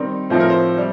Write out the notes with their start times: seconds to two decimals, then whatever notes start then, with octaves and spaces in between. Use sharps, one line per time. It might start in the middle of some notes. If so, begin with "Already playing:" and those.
Already playing: D#3 G3 C4 D#4
0.30 A2 F3 C4 D#4 C5
0.40 A#4
0.50 C5
0.78 G3